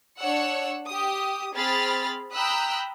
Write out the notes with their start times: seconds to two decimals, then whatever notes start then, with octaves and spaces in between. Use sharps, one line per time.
0.18 D4 C#5 F#5 E6 C#7
0.88 G4 D#6
1.54 C4 G#4 B5 F6 A6
2.34 G5 A#5 B5 D#6 E6 F#6